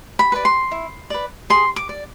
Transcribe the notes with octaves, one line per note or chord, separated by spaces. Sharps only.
B5
B4 D5
C6
E4
B4 D5
G#4 C6
D6
D5